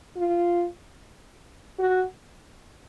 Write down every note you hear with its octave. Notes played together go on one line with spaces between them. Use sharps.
F4
F#4